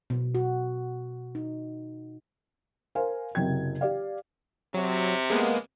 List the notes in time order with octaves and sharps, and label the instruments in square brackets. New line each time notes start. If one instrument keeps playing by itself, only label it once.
[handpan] B2
F#4
D#4
[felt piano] A#4 C5 F5 G#5
F#1 C3 F#3 G5 G#6
G4 D5 F5
[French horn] C3 [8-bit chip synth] F#3
[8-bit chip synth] G#3 A#3 B3